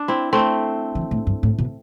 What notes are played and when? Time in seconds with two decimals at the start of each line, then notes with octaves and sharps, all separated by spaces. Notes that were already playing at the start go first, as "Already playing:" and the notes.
Already playing: D4
0.08 C4 E4
0.33 A3 C4
0.95 E3
1.11 A2
1.27 G2
1.43 A2
1.58 B2